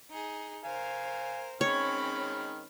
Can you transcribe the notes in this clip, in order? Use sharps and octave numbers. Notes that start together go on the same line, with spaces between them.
D#4 G#4
A#4 C5 F5 G#5
D#3 G#3 C4 C#4 C#5 B5 F6